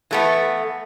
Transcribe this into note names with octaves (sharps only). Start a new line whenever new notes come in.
E3 A3 B3